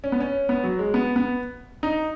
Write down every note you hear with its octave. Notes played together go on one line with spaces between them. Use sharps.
C#4
B3
C#4
B3
F#3
G#3
B3
B3
D#4